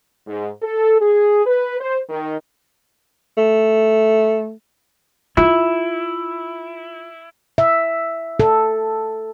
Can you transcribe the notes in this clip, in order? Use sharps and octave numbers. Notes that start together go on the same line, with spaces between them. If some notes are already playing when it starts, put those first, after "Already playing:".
G#2
A4
G#4
B4
C5
D#3
A3
E4 F4
E5
A4